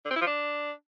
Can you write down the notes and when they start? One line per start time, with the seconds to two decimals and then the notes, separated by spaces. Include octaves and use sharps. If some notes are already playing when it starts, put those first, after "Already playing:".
0.05 D3
0.11 C4
0.16 E4
0.21 F3
0.27 D4